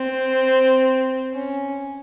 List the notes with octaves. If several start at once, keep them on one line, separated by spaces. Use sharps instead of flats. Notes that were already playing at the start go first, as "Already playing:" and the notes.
Already playing: C4
C#4